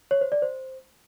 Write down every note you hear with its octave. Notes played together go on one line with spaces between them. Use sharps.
C#5
C5
D5
C5